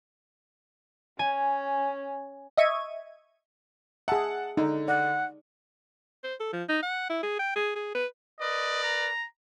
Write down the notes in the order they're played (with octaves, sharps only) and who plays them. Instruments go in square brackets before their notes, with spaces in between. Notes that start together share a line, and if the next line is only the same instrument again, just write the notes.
[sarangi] C#4 [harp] G#5
[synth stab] D#5 E5 C#6 G#6 D#7
[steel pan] G#4 E5 [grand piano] F#5 A5
[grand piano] D3 [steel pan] D#4
[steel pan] D5 [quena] F#5
[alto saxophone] C5
A4
F3
D#4
F#5
E4
G#4
G5
G#4
G#4
B4
[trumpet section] A#4 B4 D5 [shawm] D#5
[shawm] A#5